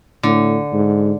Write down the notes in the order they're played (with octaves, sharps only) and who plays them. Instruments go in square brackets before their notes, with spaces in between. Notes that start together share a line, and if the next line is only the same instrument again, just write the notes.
[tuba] A2 [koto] D3
[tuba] G#2